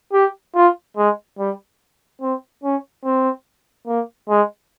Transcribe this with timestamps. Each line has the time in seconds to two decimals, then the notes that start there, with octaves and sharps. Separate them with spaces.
0.13 G4
0.55 F4
0.97 G#3
1.39 G3
2.21 C4
2.64 C#4
3.05 C4
3.87 A#3
4.29 G#3